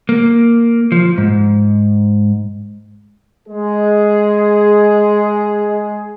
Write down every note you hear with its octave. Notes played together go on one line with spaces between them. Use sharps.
A#3
F3
G#2
G#3 G#4